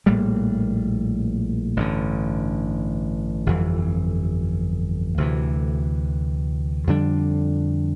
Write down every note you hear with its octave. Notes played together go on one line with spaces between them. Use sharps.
A#1 A2 G3 A#3
A1 G2 D3
G1 F2 E3
D2 C3 E3
F2 D3 G3 D4